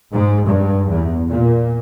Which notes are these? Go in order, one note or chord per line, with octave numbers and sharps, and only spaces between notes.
G#2
G2
E2
A#2